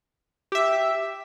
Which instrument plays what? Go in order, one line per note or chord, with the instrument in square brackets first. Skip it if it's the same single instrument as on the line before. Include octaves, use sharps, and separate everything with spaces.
[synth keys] G4 E5